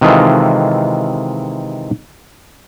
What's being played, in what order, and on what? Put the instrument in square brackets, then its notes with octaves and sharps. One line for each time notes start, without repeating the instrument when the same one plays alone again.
[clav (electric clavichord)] C3 D#3 E3 G#3 F4 A4